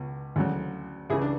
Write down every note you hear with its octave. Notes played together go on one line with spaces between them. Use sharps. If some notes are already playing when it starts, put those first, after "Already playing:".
Already playing: C#2 B2
D2 C#3 F#3
C#2 C#3 E3 E4 G#4
D4